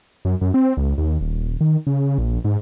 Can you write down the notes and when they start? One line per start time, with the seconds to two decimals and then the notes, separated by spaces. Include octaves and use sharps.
0.25 F#2
0.41 F#2
0.54 C4
0.77 C#2
0.98 D#2
1.21 D#1
1.61 D#3
1.87 C#3
2.18 A#1
2.45 G#2